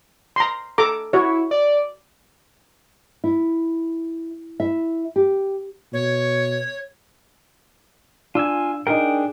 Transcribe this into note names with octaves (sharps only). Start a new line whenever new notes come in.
A#5 C6
A4 A#5 D6
E4 F#4 C#5
D5
E4
E4 E5
G4
B2 C#5
D4 F4 G#5 E6
D4 D#4 G#4 A#4 G5